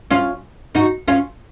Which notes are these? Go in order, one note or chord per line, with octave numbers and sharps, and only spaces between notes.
C#4 F4
D#4 F#4
C#4 F4